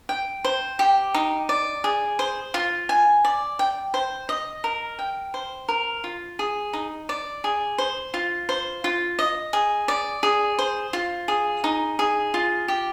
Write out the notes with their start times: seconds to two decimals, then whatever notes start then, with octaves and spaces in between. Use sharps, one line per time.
0.09 G5
0.45 C5
0.79 G4
1.14 D#4
1.49 D5
1.84 G#4
2.19 C5
2.54 F4
2.89 G#5
3.25 D5
3.59 G5
3.94 C5
4.29 D#5
4.64 A#4
4.99 G5
5.34 C5
5.69 A#4
6.04 F4
6.39 G#4
6.73 D#4
7.09 D5
7.44 G#4
7.78 C5
8.14 F4
8.49 C5
8.84 F4
9.19 D#5
9.53 G#4
9.88 D5
10.23 G#4
10.59 C5
10.93 F4
11.28 G#4
11.64 D#4
11.99 G#4
12.34 F4
12.68 G4